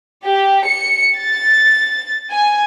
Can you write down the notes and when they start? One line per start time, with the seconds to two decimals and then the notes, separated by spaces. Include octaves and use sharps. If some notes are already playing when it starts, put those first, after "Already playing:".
0.25 G4
0.66 C#7
1.18 A6
2.30 G#5